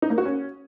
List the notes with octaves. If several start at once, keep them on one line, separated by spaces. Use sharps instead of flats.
D#4
A#3
F#4
C#4